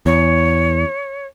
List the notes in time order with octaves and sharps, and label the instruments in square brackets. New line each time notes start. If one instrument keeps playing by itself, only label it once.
[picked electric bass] E2 [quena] C#5